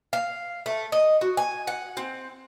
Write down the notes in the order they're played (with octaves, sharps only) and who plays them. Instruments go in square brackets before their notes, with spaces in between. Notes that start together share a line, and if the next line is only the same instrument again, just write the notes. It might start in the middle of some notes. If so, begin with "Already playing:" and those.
[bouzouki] F5
A3
D#5
F#4
G#5
F#5
C4